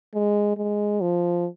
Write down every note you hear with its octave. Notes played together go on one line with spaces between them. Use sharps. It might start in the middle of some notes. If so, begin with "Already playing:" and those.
G#3
G#3
F3